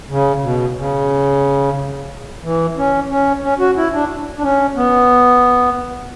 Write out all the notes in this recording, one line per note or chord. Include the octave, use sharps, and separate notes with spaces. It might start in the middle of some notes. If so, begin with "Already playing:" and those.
C#3
B2
C#3
E3
C#4
C#4
C#4
F#4
E4
D4
D4
C#4
B3